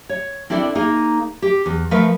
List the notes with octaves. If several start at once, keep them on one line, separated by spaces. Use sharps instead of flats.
C#5
C4 D4 E4 A4 D5
A#3 D#4 G#4
G4
E2
F3 A3 A#4 B4 E5 F5